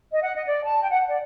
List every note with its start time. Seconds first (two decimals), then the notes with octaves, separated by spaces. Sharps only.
0.12 D#5
0.23 F#5
0.35 D#5
0.46 D5
0.64 A5
0.82 G5
0.90 F#5
1.08 D5